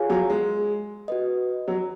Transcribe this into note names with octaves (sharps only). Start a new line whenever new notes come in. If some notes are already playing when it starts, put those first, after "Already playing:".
Already playing: F4 G#4 C#5 F5 G#5
F#3
G#3
F#4 B4 D#5
F#3